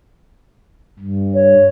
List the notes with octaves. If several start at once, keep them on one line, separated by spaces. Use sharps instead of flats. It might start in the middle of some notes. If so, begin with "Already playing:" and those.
G2
C#5